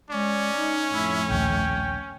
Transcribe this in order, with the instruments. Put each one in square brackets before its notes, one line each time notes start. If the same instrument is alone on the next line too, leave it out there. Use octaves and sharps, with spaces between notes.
[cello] G#3 [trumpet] C#4 [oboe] D5
[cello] D#4
[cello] F2 A2 [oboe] E4
[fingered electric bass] A#1 D#2 [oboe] G5